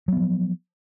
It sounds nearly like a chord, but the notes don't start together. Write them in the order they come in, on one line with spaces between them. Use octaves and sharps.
F#3 B3 F3